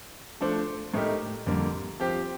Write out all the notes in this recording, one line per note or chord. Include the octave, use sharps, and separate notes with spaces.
F3 A3 D4 A4 C5
A2 A3 D#4 G4 A#4
F2 D3 G3 A#3
F3 C4 G4